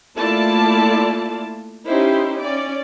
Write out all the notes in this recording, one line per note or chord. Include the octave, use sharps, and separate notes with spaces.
A3 A#3 E4 F4 D5 A5
C#4 D#4 E4 G4 C5
C#4 D5